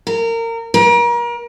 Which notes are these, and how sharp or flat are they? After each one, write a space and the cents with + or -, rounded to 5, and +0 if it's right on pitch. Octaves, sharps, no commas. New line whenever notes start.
A#4 -25
A#4 +35